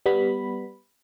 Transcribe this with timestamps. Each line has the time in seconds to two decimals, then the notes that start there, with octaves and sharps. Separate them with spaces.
0.06 G3 B3 B5